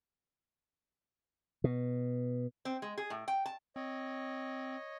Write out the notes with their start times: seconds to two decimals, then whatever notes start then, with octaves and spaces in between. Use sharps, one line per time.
1.64 B2
2.65 C4
2.82 G#3
2.98 G#4
3.10 A2
3.28 G5
3.46 A5
3.76 C4 C#5 D#5